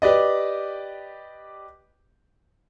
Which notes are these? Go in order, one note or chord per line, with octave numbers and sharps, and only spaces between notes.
G4 B4 D5 D#5